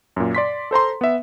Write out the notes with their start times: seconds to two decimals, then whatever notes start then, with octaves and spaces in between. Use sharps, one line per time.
0.16 F#2 A#2
0.35 D5 C6 B6
0.71 A4 C5 A#5 C6
1.01 B3 E5